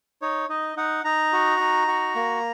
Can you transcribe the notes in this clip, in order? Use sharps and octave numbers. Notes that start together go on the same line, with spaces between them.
D#4 C#5
D#4 D#5
D#4 F#5
D#4 A#5
F#4
D#4
F#4
A#3